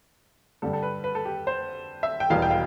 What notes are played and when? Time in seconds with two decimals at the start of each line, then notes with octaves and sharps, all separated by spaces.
0.62 G2 D3 G3 A4
0.73 A4
0.83 B4
1.04 B4
1.15 A4
1.25 G4
1.47 C5
2.03 E5
2.20 G5
2.30 E1 E2 B2 G3 F5
2.42 G5
2.51 F5